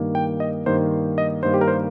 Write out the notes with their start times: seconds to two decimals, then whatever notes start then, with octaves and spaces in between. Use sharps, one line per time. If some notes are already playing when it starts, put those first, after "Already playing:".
Already playing: G2 D#3 A#3
0.15 G5
0.40 D#5
0.66 G2 D#3 A#3 C5
1.18 D#5
1.43 G2 D#3 A#3 C5
1.54 G4
1.61 A#4
1.68 C5